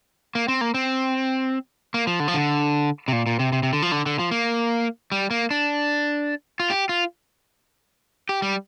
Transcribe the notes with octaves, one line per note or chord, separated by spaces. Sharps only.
A#3
C4
A#3
C4
A#3
F3
D3
F3
D3
C3
A#2
A#2
C3
C3
C3
D3
F3
D3
D3
F3
A#3
G3
A#3
D4
F4
G4
F4
G4
G3